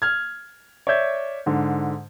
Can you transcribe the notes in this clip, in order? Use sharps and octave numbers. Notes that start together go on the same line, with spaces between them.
F6 G#6
C#5 D5 E5 G6 G#6
G#2 D3